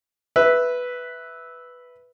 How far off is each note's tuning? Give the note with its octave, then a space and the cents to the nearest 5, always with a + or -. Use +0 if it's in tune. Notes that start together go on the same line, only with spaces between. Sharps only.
B4 +0 E5 -5